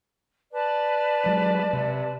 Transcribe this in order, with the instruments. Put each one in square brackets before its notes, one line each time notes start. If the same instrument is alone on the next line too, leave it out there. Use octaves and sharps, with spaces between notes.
[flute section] B4 D5 A5
[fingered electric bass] F#3 G#3
C3